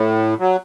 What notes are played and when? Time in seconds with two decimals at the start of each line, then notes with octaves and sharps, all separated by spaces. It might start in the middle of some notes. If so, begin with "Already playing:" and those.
Already playing: A2
0.40 F#3